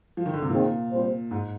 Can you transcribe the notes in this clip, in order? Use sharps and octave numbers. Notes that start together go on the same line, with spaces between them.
F3
D#3
D3
C3
A#2 D#3 G#3 C4
A#2 G3 C4 F4 C5
G#2